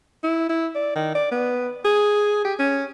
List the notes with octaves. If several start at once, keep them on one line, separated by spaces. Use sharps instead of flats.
E4
E4
D5
D#3
D5
B3
G#4
G4
C#4